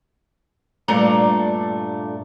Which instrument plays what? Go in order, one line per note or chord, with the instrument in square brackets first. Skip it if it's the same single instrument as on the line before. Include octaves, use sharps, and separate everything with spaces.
[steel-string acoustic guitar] G2 A#2 A3 D4 A#5